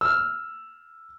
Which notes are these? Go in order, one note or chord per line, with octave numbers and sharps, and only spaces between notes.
E6 F6